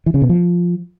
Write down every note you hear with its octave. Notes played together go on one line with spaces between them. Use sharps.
E3
C#3
B2
F3